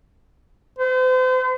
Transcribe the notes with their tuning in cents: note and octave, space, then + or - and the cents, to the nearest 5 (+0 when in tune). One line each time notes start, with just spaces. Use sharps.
C5 -40